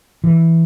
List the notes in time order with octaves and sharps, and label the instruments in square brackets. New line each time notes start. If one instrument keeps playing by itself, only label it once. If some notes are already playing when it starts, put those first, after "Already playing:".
[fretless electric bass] E3